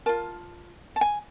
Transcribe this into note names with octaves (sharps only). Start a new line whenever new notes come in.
F4 A#4 A5
A5
G#5